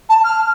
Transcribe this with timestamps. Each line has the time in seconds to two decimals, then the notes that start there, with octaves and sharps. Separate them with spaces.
0.09 A5
0.24 F6